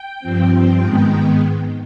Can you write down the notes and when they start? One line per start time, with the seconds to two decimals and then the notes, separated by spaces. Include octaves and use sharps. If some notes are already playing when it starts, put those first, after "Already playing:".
Already playing: G5
0.20 G2 F3 C4
0.80 G#2 D#3 G#3 B3